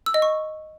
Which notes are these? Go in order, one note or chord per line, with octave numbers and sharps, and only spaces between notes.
E6
D#5
C#6